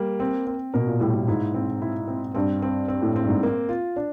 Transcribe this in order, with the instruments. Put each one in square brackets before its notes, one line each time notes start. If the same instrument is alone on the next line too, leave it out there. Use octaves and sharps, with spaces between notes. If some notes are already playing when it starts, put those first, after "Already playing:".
Already playing: [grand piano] G3 A#3
C4
C4
[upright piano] B2 [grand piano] A#4
[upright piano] A#2
[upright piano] A2 [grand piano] G3
[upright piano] A2
[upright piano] G#2 [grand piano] E4
[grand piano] C4
E4
C4
[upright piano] G2 [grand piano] C4
[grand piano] C4
C4
[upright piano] A2
[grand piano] C4
[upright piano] G2
G#2
[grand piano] A#3
F4
D4